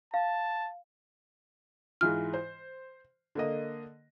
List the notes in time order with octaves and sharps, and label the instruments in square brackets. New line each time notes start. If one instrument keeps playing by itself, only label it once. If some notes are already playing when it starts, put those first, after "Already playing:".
[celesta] F5 [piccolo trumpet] A5
[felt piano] G#2 E3 F4 [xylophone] F6
[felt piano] C5
D3 A#3 D#5